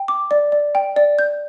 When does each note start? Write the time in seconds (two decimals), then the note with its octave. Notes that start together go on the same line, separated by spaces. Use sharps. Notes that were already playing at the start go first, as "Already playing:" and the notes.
Already playing: G5
0.08 D6
0.31 D5
0.52 D5
0.75 G5
0.96 D5
1.19 G6